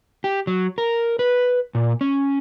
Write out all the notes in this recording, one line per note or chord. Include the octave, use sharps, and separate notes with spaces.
G4
F#3
A#4
B4
A#2
C#4